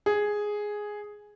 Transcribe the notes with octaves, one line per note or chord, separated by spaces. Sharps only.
G#4